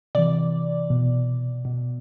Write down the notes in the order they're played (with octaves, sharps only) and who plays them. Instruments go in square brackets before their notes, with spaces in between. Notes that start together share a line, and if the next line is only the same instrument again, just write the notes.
[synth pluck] C3 E3 D5
B2
B2